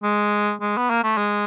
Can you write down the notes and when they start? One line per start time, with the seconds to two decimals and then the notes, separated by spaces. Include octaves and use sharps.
0.03 G#3
0.60 G#3
0.77 B3
0.90 A#3
1.04 A3
1.17 G#3